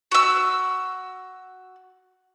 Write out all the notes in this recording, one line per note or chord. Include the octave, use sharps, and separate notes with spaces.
F#4 E6